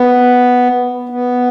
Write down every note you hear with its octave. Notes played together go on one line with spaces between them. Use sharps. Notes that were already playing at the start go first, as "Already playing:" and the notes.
Already playing: B3
B3